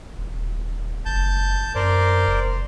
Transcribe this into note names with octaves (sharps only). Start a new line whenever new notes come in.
D#1
F#1 A5 G6
F#2 A#4 C5 D5
F1